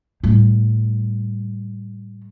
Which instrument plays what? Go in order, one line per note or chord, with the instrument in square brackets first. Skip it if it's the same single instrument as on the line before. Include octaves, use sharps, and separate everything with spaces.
[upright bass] A2 G3